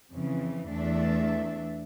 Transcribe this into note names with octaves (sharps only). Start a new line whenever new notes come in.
F2 C#3 E3
E2 A3 D4 E5